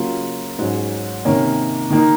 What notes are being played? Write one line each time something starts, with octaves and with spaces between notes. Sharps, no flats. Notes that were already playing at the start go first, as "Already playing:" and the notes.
Already playing: C#3 F#3 A#3 F4
G#2 F#3 C#4
C3 D#3 A#3 C#4
D#3 A#3 D#4